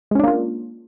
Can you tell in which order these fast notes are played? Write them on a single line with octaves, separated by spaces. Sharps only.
G#3 C#4 D4 A#3 F4